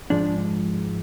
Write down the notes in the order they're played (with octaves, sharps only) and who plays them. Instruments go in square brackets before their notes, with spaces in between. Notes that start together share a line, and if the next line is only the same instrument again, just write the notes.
[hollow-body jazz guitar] G#2 F3 G#3 D4